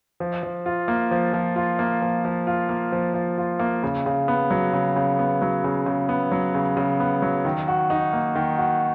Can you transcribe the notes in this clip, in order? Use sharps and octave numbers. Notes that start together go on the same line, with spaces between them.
F3
F3
F4
A#3
F3
F3
F4
A#3
F3
F3
F4
A#3
F3
F3
F4
A#3
C#3
C#3
B3
F#3
C#3
C#3
B3
F#3
C#3
C#3
B3
F#3
C#3
C#3
B3
F#3
D#3
F#4
D#4
A#3
D#3
F#4